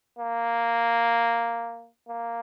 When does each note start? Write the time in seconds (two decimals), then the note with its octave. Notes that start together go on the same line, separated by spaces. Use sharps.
0.19 A#3
2.08 A#3